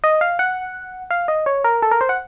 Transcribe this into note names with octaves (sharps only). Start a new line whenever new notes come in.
D#5
F5
F#5
F5
D#5
C#5
A#4
A4
A#4
C5
F#5